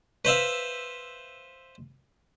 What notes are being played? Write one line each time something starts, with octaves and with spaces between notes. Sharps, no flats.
B4 C5 E5 F5